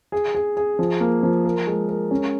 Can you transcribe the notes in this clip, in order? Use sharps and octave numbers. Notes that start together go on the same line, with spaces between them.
G#4
G#4
G#4
F3
A#3
F3
A#4
G#3
A#4
C#4